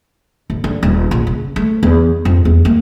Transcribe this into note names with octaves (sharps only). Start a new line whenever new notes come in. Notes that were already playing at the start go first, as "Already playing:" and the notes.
D1
D3
D#1
A#1
C#3
A3
E2
F2
E2
A#3